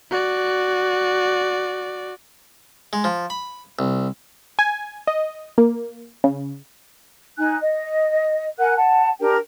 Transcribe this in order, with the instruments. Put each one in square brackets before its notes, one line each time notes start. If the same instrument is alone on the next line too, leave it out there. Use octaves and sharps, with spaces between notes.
[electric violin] F#4 D5
[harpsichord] G#3
F3
B5
C2
[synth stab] G#5
D#5
A#3
C#3
[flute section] D#4 G#5 F#6
D#5
A#4 F#5 G#5 F#6
F#5 A5
D4 G4 A#4 G5